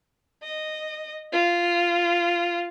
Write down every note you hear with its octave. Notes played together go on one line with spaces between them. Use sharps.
D#5
F4